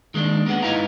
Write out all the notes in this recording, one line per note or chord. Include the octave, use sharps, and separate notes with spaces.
D#3 G#3 A#3 C#4 D4
A#3 B3 G#4 F#5
G#2 D#4 E4 B4 F5 A#5